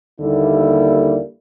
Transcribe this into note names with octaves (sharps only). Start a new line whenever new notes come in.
D#2 D3 G3 A#3 E4